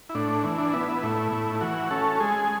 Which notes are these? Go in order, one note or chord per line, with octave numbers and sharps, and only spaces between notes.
E4
A2 D4
E3
D4
B3 E4
E4
A2 E4
A2
E4
E3 F#4
C#4 A4
G#3 G#4